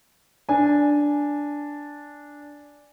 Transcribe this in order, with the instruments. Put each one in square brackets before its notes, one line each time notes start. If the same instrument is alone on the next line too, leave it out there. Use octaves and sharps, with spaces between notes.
[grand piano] D4 G#5